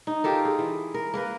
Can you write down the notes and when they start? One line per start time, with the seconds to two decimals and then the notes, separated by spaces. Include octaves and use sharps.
0.07 D#4
0.24 F4 G4 A4 A#4
0.45 G#4
0.59 E3
0.94 A#4
1.14 A#3 A#4 B4